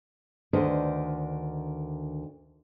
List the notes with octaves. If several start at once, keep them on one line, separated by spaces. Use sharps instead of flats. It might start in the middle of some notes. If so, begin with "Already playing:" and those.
D2 D#3 D4 B4 C5 D#5